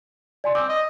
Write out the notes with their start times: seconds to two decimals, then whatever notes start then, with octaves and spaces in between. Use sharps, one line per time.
0.44 D5 G#5 C6
0.55 C4 D6
0.69 D#5